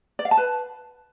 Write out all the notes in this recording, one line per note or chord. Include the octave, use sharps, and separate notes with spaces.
D5
F5
A5
B4